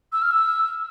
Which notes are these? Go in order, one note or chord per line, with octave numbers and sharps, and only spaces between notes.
E6
F6
E6